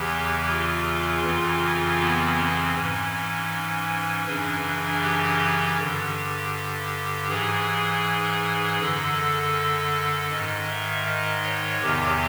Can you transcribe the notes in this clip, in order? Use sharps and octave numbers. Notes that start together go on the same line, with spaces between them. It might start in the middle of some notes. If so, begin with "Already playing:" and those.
Already playing: E2 C#3 E3 G4
F4
F2 C#3 E3
B3
C4
G#2 E3 C#4
F#2 C#3 E3 D4
G4
G2 D3
G#2 E3 G#4
F#2 D3 A4
G#2 D#3 D#5
E5
D#5
C#5
E2 C3 D#3 G4